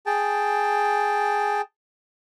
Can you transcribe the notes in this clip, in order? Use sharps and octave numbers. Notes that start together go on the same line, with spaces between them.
G#4 G5 A5